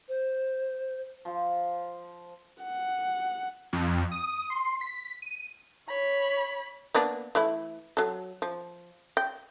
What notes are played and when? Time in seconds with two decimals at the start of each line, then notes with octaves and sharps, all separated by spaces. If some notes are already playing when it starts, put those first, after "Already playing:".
0.08 C5
1.25 F3
2.63 F#5
3.73 F2
4.12 D#6
4.50 C6
4.81 B6
5.22 D#7
5.88 C#5 B5
6.94 A#3 B3 D4
7.35 E3 A3 E4
7.97 F#3 A4
8.42 F3
9.17 G5